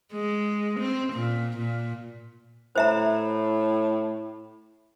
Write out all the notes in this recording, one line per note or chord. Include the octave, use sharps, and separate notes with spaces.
G#3
C4
A#2
A#2
A2 C5 E5 A#5